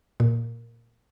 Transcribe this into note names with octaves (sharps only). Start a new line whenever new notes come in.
A#2